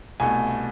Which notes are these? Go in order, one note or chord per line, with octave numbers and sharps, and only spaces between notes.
C2 B2 A3 G#5